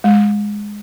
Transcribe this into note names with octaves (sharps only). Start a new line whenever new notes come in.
G#3